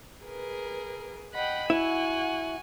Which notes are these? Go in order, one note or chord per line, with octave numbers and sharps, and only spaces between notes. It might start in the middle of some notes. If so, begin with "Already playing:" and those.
G#4 A#4 B4
D#5 F#5 G5 B5
E4 F#4 F#5 G#5